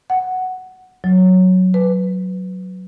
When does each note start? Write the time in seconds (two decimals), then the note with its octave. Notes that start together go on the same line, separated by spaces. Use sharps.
0.10 F#5
1.04 F#3
1.74 B4